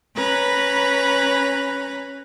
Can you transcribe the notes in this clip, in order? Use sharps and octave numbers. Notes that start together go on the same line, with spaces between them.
C#4 B4 A#5 B5